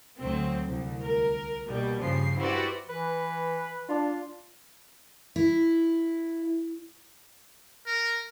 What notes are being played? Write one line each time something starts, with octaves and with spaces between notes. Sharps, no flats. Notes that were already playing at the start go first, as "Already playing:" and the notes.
D2 F#3 C4
C2
A#4
B2 G3 A#3
G2 C#3 F3 G4 C7
E4 F#4 G4 B4 C5 D5
E3 B4
D4 F4
E4
A#4